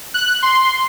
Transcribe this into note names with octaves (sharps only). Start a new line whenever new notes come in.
F#6
C6